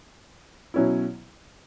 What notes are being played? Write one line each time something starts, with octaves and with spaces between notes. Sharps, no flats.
B2 F#3 C#4 E4